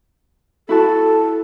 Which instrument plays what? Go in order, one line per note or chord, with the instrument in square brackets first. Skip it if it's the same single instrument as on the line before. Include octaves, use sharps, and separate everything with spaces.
[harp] E4 F#4 A5 [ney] A4